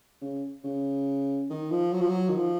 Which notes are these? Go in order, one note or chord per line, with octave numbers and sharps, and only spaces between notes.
C#3
C#3
D#3
F3
F#3
F3
F#3
D#3
F3